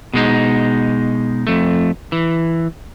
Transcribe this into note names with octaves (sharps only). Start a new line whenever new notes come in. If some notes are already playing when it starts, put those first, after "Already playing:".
B2 G#3 D#4
F2 A3
E3